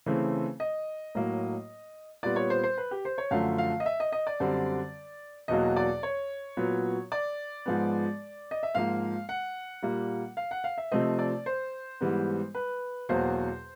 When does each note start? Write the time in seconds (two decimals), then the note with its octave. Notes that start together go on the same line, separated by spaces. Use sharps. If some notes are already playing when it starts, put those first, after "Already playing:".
0.06 C#3 E3 A3 C4
0.60 D#5
1.15 A2 F#3 A#3
2.23 A#2 G3 B3 D5
2.36 C#5
2.50 C5
2.63 C5
2.78 B4
2.91 G4
3.05 C5
3.18 C#5
3.31 F#2 D3 F3 A3 F5
3.58 F5
3.80 D#5
3.86 E5
4.00 D#5
4.12 D#5
4.27 D5
4.40 F#2 D3 G3 C4
5.48 E2 B2 F#3 A#3 D#5
5.76 D5
6.03 C#5
6.57 A#2 F#3 B3
7.12 D5
7.66 G#2 F3 G#3 B3
8.51 D#5
8.63 E5
8.75 G#2 F3 A#3 F5
9.29 F#5
9.83 A#2 G3 A#3
10.37 F5
10.51 F#5
10.64 F5
10.78 E5
10.92 C3 F3 A3 C4 D#5
11.19 D5
11.46 C5
12.01 G#2 E3 G3 B3
12.55 B4
13.09 E2 B2 F#3 A#3 C5